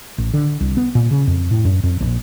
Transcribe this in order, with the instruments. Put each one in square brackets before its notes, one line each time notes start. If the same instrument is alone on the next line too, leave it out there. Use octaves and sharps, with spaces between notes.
[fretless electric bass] A1
D3
C2
B3
A#2
C#3
F2
A2
F#2
F2
A#1